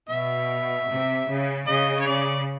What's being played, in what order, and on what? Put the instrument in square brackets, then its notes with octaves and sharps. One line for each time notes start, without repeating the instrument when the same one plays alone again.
[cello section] B2 [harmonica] E5
[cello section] C3
C#3
[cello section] C#3 [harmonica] D#5
[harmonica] C#5
D5